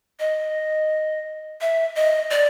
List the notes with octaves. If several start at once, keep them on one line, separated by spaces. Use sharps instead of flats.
D#5
E5
D#5
D5